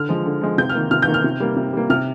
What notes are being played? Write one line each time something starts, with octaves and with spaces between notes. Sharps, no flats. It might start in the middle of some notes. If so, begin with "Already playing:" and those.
Already playing: D3 F6
F3 G#3
D3
F3 G#3
C3 G6
F6
D#3 A#3
C3 F6
G6
D#3 A#3
F6
C3
G3 A#3
C3
G3 A#3
C3 F6